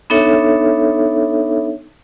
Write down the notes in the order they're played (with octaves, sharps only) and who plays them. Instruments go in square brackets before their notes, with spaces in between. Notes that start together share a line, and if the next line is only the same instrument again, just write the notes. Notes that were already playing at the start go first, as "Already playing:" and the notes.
[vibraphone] B3 D4 D#4 A4 C#5 E5